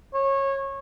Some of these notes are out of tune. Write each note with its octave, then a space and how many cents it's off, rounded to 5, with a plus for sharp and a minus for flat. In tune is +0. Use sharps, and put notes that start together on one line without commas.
C#5 -20